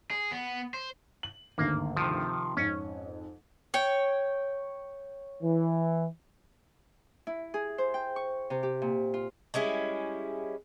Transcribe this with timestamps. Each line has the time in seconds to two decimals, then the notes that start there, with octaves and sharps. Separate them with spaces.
0.11 G#4
0.32 B3
0.74 C5
1.23 F#7
1.58 G#1 D2 G2 A#3
1.97 C3 D#3 F3
2.57 F2 G#2 C#4
3.74 C#5 G5
5.42 E3
7.27 E4
7.54 G#4
7.78 C5
7.94 G5
8.16 C#6
8.50 C3
8.63 G4
8.82 A#2
9.14 F4
9.54 G3 G#3 C#4 E4